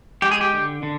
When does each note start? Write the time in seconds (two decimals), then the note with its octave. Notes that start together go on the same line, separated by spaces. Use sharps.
0.22 G#3 G4
0.31 G#4
0.41 G4
0.54 D3
0.83 D3